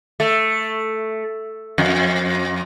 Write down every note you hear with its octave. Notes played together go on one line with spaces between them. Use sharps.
A3
F2